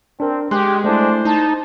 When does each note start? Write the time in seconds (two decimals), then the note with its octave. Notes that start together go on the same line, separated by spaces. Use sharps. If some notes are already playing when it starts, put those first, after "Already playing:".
0.20 C4 D4 A#4
0.51 G#3 G4 C6 F#6
0.84 A3 D4 E4 C5
1.25 D#4 A5